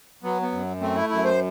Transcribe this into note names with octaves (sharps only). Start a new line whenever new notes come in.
F#3 B3
B3
F#2
A3 C4
E4
F#2 E4
C5